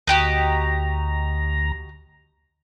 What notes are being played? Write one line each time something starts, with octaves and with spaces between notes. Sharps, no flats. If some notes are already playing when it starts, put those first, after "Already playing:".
D2 F#4 G4 D#5 A#5